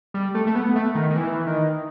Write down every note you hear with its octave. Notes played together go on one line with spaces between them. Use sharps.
G3
A3
A3
B3
A3
D#3
D#3
E3
D#3